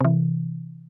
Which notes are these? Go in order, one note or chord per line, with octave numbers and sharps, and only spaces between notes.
C3 E3